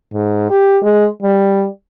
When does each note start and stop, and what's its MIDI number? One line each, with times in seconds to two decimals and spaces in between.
0.13 0.50 44
0.50 0.77 67
0.83 1.07 56
1.22 1.66 55